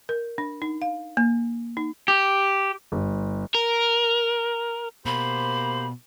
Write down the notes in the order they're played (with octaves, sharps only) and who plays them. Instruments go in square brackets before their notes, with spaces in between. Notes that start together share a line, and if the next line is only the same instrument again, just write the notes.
[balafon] A#4
D4
D#4
F5
A#3
D#4
[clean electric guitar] G4
[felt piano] G1
[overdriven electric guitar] A#4
[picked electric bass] B2 [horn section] A#3 G4 C5 [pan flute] B5